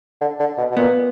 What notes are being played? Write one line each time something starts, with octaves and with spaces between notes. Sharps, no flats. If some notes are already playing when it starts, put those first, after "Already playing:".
D3
D3
B2
B2
A#2 B3